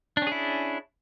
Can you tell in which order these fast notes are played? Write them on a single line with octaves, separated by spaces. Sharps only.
D4 C#4 G#4 E4